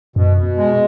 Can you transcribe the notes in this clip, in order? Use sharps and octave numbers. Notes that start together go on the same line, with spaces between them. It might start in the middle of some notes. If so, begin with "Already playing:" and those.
F#2 B2
B2
G#3